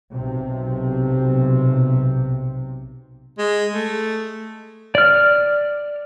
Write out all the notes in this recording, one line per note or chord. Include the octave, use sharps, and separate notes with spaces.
B1 C3
G#3
A3
D5 F6